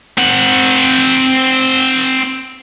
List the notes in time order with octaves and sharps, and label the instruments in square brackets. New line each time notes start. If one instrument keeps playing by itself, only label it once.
[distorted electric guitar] C4 F#5